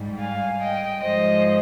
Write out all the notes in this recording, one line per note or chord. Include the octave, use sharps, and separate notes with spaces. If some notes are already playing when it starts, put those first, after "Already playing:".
Already playing: G#2 G3
F5 G#5
D#5 G5
G#2 F3 G#3 C5 D#5